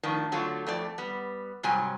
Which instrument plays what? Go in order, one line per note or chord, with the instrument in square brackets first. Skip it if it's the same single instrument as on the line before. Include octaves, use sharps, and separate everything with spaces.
[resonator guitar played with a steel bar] A2 D#3 F3 D4
D3 F#3 A3 F4
F2 A3 D5
G3 B3
G#2 C3 F#3 G3 G#5